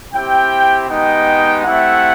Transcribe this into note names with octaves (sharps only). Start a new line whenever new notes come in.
C4 E4 G4 G5
G#3 B3 D#4 G4 G5
A3 C4 E4 G4 F#5